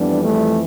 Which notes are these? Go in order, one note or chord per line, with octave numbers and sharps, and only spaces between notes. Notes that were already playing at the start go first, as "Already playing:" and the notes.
Already playing: F2 E3 G3 B3 D4
A3